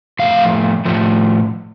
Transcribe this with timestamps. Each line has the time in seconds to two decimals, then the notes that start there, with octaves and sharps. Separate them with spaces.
0.19 A2 F3 A3 F5
0.85 A2 F3 A3